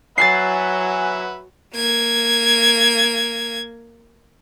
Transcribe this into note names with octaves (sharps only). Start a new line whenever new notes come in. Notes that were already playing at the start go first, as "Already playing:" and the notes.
F#3 B4 E5 F#5 G#5 A6 C7
A#3 G#6